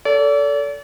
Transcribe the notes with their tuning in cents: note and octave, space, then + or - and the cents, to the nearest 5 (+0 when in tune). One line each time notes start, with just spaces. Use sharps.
A4 +10 D5 -40